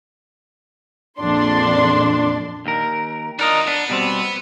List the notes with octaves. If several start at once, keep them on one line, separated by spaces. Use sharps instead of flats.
A#1 F2 D4 C6
D#2 A#4
D4 D#4 F4 A#4 D#5
B3 D4
B2 G3 C4